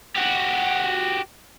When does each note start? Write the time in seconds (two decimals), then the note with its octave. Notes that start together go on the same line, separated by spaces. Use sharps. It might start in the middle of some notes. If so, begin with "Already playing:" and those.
0.16 F#4 G4